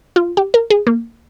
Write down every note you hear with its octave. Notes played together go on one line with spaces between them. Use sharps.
F4
G4
A#4
G#4
A#3